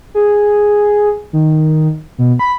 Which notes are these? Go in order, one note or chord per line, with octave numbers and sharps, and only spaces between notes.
G#4
D#3
B2
B5